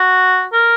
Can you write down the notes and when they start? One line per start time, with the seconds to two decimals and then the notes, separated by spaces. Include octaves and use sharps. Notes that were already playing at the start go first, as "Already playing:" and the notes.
Already playing: F#4
0.53 A#4